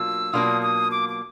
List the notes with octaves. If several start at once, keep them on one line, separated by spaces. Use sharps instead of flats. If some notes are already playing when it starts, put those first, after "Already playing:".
Already playing: B2 F#3 A#3 D4 F4 E6
B2 F#3 A#3 D4 F4 D#6
D#6
D6
D6